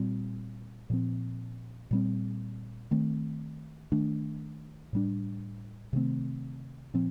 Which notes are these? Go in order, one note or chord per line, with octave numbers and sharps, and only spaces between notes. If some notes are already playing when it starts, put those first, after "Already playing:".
Already playing: A#2 G3 C4
A#2 F3 C4
A#2 G3 C4
D#3 A3 C4
D#3 A3 D4
A2 G3 D4
C3 D#3 A3 C4
A#2 F3 C4